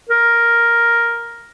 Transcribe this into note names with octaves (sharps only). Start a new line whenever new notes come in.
A#4